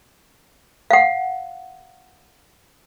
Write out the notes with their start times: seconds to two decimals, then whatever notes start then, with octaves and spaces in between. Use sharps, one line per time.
0.91 F5 F#5